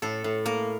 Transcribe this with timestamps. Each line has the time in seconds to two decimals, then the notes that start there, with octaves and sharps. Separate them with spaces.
0.02 A2 A4
0.24 A2
0.45 A#3 A#4